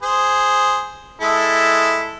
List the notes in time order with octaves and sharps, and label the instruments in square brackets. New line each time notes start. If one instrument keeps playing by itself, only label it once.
[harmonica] G#4 C5
G#3 E4 A4